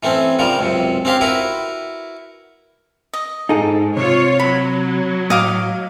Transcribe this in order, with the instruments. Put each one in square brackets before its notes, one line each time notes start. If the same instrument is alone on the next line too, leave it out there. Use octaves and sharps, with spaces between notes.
[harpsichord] E3 A3 C4 C#4
C#3 F3 G3 A#4
C#2 F#2 C3
C4 C#4 G4 F5 C6
E4 F#4 A#4 B4
[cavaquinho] D#5
[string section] G#2 [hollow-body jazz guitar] D#4 G#4 A4
[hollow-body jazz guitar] C3 [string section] F4 C#5
[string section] F#3 [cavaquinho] B5
[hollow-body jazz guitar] A2 [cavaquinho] D#5 F5 D6